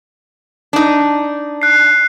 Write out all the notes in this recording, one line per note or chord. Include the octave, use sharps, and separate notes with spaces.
D4 D#4
F#6 C7